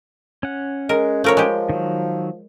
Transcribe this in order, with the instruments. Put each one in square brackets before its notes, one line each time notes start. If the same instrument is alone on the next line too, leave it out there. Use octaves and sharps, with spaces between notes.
[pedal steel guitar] C#4 F#5
[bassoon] G#3 [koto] A#4
[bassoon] F3 [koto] A3 A#4 C#5
[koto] G#3 G4
[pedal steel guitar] D#3 F#3